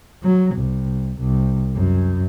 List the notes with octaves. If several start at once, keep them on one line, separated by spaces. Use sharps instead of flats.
F#3
C2
C2
F#2